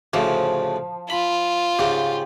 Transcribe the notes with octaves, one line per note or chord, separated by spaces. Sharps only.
D2 A2 C#3 F3
F4 B5
G#2 C#3 G4